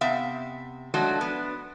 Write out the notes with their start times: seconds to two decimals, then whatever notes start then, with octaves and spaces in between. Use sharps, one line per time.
0.01 C3 B3 E5 F5
0.94 F3 F#3 G#3 A3 D4 F#4
1.21 B3 D4